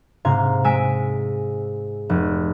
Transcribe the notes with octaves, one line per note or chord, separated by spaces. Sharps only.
G#2 C3 F5 A#5 C6 G#6
G#3 G#5 E6 B6 D7
F1